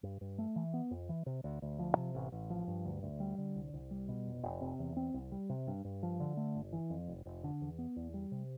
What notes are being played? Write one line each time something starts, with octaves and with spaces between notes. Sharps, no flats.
G2
G2
A3
E3
B3
F2
E3
C3
D2
D2
F3
C3
A1
A1
F3
G2
D2
D2
G3
D3
C2
C2
G3
B2
F1
F1
C3
E2
C4
C2
G3
C3
G2
G2
F3
D3
A3
G1
E3
F2
F1
F1
D3
E2
B3
E2
G3
C3